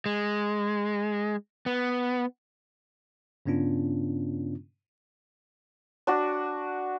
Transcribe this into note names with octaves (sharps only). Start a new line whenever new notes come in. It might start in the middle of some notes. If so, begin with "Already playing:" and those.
G#3
B3
G2 C#3 B3 C#4 D4 F4
D4 F#4